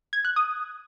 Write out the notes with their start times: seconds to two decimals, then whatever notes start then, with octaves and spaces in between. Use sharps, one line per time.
0.13 G#6
0.25 F#6
0.36 D#6